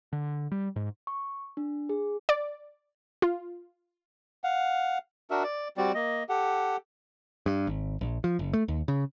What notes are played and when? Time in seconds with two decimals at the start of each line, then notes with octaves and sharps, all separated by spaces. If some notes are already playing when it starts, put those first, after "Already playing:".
0.13 D3
0.52 G3
0.76 G#2
1.07 C#6
1.57 D4
1.89 G#4
2.29 D5
3.22 F4
4.44 F5 F#5
5.31 D4 F#4 A#4 E5
5.43 D5
5.77 G3 C4 F#4 D5
5.95 A#3 D#5
6.29 G4 A4 F#5
7.46 G2
7.67 G#1
8.01 A#1
8.24 F3
8.39 F#1
8.53 A3
8.68 D#2
8.88 C#3